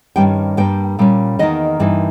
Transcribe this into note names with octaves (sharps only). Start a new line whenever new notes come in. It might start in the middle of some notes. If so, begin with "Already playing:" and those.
G2 D#3 G3 C#4 G5
G2 G3 A#3 G5
A#2 G3 C#4
E2 D#3 A#3 D#4 D#5
G2 E3 A#3 D#4